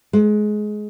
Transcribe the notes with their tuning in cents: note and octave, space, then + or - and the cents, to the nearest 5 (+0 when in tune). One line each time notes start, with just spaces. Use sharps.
G#3 +20